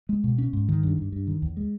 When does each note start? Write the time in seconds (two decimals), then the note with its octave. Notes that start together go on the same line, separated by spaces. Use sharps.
0.09 G#3
0.24 B2
0.38 C#4
0.53 G#2
0.69 D#3
0.83 G2
0.98 G2
1.12 G2
1.27 D#3
1.42 E2
1.57 G#3